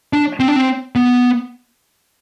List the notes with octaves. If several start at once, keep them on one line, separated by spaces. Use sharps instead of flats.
D4
C4
D4
C4
B3